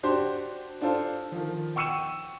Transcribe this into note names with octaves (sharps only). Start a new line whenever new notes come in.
D4 F#4 G4 C5 C6
D4 F4 A4 C5
D#3 F3
G5 C#6 E6 C#7 D#7 E7